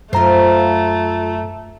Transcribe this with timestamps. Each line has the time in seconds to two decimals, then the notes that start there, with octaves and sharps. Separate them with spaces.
0.13 F#2 A3 F4 C5 A#5